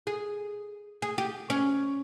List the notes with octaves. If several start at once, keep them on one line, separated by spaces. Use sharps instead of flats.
G#4
G#4
G4
C#4